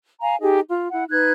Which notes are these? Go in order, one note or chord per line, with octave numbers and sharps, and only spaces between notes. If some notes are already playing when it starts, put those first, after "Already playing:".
F5 G#5 A#5
D#4 G4 G#4 D#5
F4
E4 F#5
D#4 B4 F#6 G#6